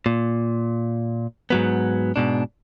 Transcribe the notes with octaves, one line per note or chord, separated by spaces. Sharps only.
A#2
G#2 F#3 B3
G#2 B2 D4